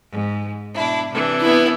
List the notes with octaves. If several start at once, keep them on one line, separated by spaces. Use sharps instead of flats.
G#2
B2 D4 E4
C3 E3 D4
B3 E4